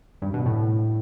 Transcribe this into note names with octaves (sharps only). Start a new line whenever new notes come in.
G2
B2
A2